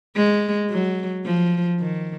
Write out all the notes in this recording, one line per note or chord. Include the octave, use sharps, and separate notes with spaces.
G#3
F#3
F3
D#3